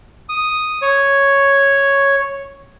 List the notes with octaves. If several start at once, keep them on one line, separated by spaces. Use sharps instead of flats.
D#6
C#5